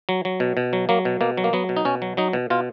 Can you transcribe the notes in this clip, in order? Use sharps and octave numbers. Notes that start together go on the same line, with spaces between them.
F#3
F#3
B2
B2
F#3
F#3 A#3
B2
B2 A#3
F#3
A#3
F#3 B3
B2
D#4
B2 C#4
F#3
F#3 D#4
B2
B2 F4